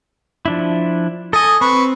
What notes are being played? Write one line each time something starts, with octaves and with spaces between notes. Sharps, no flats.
F3 D4 E4
A4 D#5 G#5
C4 B4 C#6